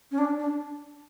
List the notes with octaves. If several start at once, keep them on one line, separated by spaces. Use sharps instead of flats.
C#4
D4
D4